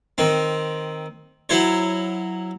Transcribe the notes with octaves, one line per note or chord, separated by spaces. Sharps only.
D#3 C4
F#3 E4 C5 C#5